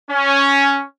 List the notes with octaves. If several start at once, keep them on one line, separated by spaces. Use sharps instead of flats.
C#4